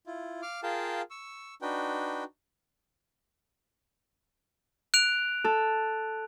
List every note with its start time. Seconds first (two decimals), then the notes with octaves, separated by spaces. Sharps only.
0.07 E4 F4
0.42 F5 D6 F6
0.63 F4 G#4 A#4 F5 G5 A5
1.11 C#6 E6
1.62 D4 D#4 F#4 B4 G5
4.94 F#6 D7 F7
5.44 A4